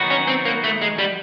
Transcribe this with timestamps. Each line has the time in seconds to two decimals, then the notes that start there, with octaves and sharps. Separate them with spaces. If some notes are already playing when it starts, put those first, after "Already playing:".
Already playing: D#3 F#3 B3 D#4 F#4
0.10 C#4
0.27 C4
0.45 A#3
0.64 A3
0.81 G#3
0.98 G3